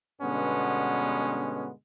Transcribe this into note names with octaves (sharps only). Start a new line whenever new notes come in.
G2 B2 D3 G#3 B3 C#4